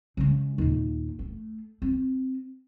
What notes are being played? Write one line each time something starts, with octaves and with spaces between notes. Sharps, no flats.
C#3 G#3
D#2 A#2
A3
C4